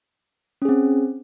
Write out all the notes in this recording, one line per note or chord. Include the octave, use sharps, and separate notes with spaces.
C4 C#4 G#4